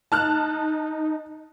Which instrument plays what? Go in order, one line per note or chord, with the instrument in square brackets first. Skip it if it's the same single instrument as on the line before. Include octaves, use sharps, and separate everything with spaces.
[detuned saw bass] D#4 [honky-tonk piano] A5 F6 F#6